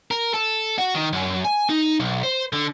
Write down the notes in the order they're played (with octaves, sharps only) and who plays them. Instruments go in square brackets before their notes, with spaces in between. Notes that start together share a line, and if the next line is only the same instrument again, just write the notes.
[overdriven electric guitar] A#4
A4
F#4
D#3
F#2
G#5
D#4
B1
C5
D3